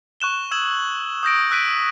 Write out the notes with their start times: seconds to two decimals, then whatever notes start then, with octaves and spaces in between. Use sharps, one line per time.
0.20 C#6 F#6 E7 G7
0.51 D#6 E6 G#6 E7 F#7
1.23 D#6 G6 A#6 D7
1.51 E6 F#6 B6 D7 D#7